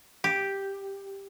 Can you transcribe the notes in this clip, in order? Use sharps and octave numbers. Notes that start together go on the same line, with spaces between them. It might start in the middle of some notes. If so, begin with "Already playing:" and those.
G4